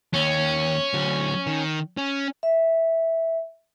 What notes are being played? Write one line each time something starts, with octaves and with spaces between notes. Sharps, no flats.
D#2 C#4
D2 F#3
D#3
C#4
E5